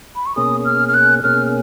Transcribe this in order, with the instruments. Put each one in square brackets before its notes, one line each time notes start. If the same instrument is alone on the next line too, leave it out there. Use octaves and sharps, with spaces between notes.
[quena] B5
C#6
[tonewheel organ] B2 A#3 C#4 G#4 [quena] D#6
[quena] F6
F6
F#6
[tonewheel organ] B2 A#3 C#4 G#4 [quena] F6